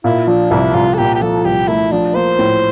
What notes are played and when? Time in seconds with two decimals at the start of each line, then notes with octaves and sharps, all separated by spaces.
0.04 A#2 E4
0.27 F3 D4
0.51 C2 E4
0.74 C2 F4
0.94 A4
0.98 A#2 G4
1.15 G4
1.21 F3 A4
1.45 C2 G4
1.68 A3 E4
1.92 F3 D4
2.15 A#3 C5
2.39 A2